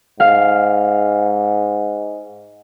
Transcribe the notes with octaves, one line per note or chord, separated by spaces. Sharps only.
G#2 F5